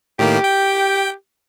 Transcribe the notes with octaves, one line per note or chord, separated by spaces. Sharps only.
A2 D#3 A#3 G4
G5